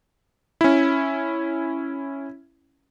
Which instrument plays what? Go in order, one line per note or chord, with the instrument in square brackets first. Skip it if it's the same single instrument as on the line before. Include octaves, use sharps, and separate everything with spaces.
[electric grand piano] C#4 E4